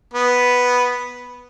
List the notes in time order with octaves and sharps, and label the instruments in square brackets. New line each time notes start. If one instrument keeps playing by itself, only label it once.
[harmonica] B3